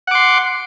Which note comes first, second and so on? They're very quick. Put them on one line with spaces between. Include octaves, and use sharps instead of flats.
F#5 D6 C6